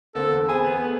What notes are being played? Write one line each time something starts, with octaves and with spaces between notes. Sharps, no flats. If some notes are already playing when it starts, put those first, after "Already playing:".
D3 A#3 C4 A4
E2
C4 G#4 G#5 B5
B3
A3